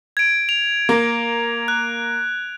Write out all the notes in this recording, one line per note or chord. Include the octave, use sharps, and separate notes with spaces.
G#6 D7
F7
A#3
F#6